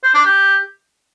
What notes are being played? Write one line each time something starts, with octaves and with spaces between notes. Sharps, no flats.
C5
D4
G4